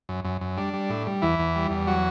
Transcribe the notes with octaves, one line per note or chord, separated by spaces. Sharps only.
F#2
F#2
F#2
G3 D4
G3
A2
G3
E2 E3 E4
E2
G3
E2
F#3 F#4